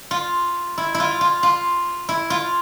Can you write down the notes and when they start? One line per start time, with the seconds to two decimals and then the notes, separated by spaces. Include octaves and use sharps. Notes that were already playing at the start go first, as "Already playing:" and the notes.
0.11 F4
0.78 E4
0.94 E4
1.00 F4
1.21 F4
1.43 F4
2.09 E4
2.30 F4